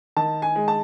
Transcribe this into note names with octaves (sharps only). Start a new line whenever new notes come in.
D#3 A5
G#5
G#3
A5